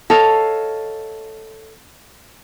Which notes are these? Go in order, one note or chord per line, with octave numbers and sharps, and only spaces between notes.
A4 C#5 D#5 F5